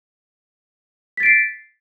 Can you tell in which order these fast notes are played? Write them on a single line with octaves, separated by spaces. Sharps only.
B6 A6 D7 C7